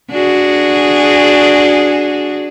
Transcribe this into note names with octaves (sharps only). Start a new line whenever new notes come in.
D4 F#4 G#4